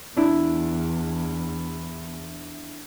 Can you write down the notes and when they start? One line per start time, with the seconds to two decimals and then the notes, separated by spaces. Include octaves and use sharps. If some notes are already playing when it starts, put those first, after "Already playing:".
0.17 E2 D4 E4